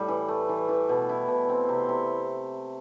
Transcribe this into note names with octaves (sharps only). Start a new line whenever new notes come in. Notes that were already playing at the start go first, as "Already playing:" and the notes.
Already playing: A2 G3
E3
A3
E3
E3
B2
E4
B2
C4
C3
C3